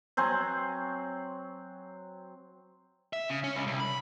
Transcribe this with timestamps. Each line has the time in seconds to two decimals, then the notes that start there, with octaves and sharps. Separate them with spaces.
0.17 F#3 C4 C5 G#5
3.13 E5
3.29 C#3
3.44 C#4
3.55 C#2
3.67 C2
3.80 B5